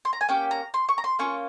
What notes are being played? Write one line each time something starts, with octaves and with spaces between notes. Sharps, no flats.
C6
A#5
G#5
A#3 C#4 G4 G5
A#5
C6
C#6
A#5
C6
A#3 C#4 F4 C#6